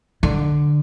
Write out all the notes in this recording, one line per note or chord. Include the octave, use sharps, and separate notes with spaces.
D3